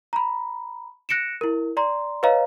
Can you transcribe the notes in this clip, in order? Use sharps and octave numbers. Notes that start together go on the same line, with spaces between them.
A#5 B5
F#6 A#6 C#7 D7 E7
E4 A#4
D5 A#5 C6
B4 C#5 D#5 F5 A#5